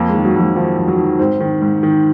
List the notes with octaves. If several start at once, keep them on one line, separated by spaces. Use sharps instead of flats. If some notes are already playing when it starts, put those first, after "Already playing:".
Already playing: F2 A#3
G#3
D#3
F#3
F2 F#3
D#3 F3
F2
F#3
D#3
G#2 C4
D#3
G#2
D#3